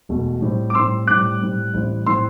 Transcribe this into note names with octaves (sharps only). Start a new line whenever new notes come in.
E1 E2 B2 A3
A2 G3 C4
D6
A2 G3 C4 C6 E6
A2 G3 C4 D6 F#6
A2 G3 C4
A1 A2 G3 C4 E4
A2 G3 C4 E4 C6 E6